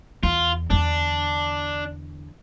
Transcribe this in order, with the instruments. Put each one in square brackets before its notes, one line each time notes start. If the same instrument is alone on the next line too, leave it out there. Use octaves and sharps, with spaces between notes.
[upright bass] E2 [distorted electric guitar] F4
[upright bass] E2 D3 [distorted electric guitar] D4